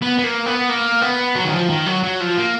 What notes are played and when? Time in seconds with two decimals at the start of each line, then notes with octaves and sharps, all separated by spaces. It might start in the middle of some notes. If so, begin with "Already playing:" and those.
0.02 B3
0.19 B3
0.24 A#3
0.46 B3
0.69 A#3
1.02 B3
1.35 F#3
1.45 D#3
1.53 F3
1.69 D#3
1.86 F#3
2.03 F#3
2.20 F3
2.38 A#3